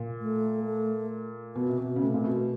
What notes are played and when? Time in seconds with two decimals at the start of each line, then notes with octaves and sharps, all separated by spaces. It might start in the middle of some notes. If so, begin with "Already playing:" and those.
Already playing: A#2
0.20 A3
0.66 A3
1.55 B2 B3
1.68 C3
1.78 B2
1.96 C#3
2.00 C3 A3
2.14 A#2
2.24 B2
2.35 A3